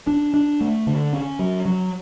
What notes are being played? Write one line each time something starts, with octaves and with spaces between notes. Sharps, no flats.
D4
D4
A3
D3
C#4
F#3
F#3